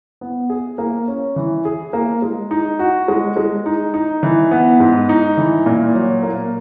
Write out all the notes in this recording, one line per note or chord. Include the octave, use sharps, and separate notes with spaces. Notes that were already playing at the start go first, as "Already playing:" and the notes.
B3
G#4
A#3
C#4
E3
G#4
A#3
G#3
D#4
F#4
G#3
G#3
D#4
D#4
E3
B3
G#2
D#4
E3
A#2
F#3
A#3